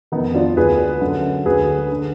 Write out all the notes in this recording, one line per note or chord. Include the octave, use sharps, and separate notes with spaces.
F2 D#3 B3 D#4
D4 F4
D2 D3 G#4 B4
F#2 D3
D2 D3 G#4 B4
D3